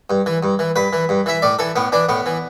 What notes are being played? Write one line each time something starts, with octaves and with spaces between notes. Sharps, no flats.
G2
E3
G2
E3
G2 B4
E3
G2
E3 E5
A2 D5
E3 A4
A2 B3
E3 D4
A2 B3
E3